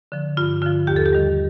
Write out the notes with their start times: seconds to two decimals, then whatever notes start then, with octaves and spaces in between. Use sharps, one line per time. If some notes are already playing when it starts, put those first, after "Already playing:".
0.12 D3 F3
0.37 G2 F4
0.62 D3 F3 F4
0.87 D#2 G4
0.96 A4
1.06 G4
1.13 D#3 G3